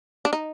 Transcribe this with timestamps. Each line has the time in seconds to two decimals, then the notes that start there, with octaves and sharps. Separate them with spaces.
0.25 D4
0.33 D#4